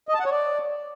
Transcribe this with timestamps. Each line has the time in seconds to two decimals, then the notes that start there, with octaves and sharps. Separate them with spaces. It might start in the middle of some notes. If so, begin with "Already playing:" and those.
0.09 D#5
0.14 A5
0.20 F#5
0.25 C#5
0.31 D5